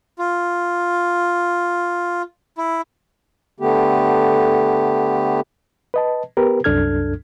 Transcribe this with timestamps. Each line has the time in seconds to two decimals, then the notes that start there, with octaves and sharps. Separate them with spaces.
0.19 F4
2.58 E4
3.60 D3 A3 B3 G4
5.94 B4 D#5 A5
6.37 B3 G4 A#4 B4
6.64 C2 F#2 D4 A4 F6 G#6